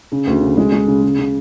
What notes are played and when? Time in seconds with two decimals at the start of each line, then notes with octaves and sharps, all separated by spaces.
0.12 C#3
0.27 D2
0.42 C#3
0.57 G#3
0.72 G#3
0.87 C#3
1.03 C#3
1.18 C#3